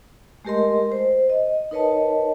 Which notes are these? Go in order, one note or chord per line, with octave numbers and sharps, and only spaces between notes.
G#3 A3 G4 A#4 D#5 C6
C5
D#5
D#4 A#4 B4 C#5 D#5 A5